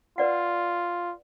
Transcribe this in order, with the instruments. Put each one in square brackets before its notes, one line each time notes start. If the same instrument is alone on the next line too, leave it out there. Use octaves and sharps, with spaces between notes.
[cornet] F4 [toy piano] B4 D5 F#5